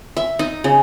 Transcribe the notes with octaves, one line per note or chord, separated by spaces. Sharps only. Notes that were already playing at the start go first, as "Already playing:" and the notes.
E5
D#4
C#3